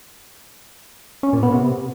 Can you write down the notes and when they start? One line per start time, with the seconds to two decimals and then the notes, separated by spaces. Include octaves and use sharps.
1.23 C#4
1.33 A#2
1.43 B3
1.52 C3